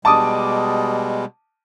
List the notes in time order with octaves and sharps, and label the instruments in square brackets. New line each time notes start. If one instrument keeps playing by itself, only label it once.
[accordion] B2 G3 G#3 [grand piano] A5 D6 D#6